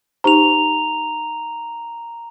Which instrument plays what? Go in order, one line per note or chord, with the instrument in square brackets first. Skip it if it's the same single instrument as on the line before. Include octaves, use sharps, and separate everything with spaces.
[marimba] D#4 G4 C5 [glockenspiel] A#5 F7